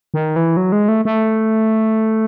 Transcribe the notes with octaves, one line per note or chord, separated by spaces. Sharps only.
D#3
E3
F#3
G#3
A3
A3